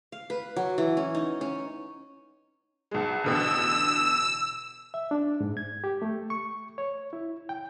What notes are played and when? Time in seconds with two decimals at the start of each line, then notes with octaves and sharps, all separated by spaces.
0.12 F5
0.30 B4
0.56 F#3
0.78 E3
0.97 C#4
1.15 D#4
1.41 C#4
2.91 B1 G#3
3.24 A1 B2 D3 E6
4.94 E5
5.11 D4
5.41 G#2
5.57 G#6
5.84 G4
6.02 A3
6.30 C#6
6.78 C#5
7.13 E4
7.49 G5